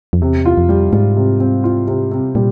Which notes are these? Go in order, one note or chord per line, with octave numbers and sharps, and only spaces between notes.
F2
E2 C3
F4
F2
G3
G#2 G3
C3
C4
F4
C3
C3
A#2 G3